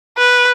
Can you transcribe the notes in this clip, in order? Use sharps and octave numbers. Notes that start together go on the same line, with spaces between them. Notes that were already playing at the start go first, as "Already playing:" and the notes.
B4